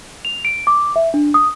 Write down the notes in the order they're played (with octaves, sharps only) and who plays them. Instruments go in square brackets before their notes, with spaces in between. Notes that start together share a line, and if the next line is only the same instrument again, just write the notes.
[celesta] F7
D7
D6
E5
D4
D#6